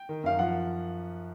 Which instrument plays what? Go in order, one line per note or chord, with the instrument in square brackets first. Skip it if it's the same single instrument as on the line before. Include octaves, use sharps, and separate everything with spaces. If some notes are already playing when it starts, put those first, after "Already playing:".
Already playing: [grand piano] G5
D#3
F#2 F5
F3 F#5